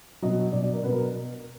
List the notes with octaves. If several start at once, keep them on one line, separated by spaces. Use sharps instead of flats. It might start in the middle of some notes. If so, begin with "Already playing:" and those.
B2 F#3 D#5
B2 F#3 D5
D5
A#4
B2 F#3 B4
A#4